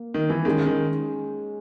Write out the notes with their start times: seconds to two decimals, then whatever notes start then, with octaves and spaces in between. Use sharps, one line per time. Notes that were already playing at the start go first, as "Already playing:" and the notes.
Already playing: A#3
0.14 D#3
0.30 E3
0.45 D#3 G#3 C#4 G#4
0.66 D#3